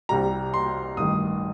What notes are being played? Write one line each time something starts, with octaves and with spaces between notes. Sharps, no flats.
C2 C3 G3 A#5
C6
A1 G2 D#3 D#6